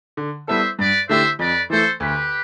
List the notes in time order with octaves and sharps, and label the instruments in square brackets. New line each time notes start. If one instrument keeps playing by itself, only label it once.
[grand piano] D3
[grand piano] G3 B3 E4 A4 [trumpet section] C5 E5
[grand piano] G2 [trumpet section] B4 D5
[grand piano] D3 A3 E4 G4 [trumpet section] C5 E5
[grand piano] F2 [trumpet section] B4 D5
[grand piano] E3 A3 [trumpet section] A4 C5
[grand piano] D2 [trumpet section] G4 B4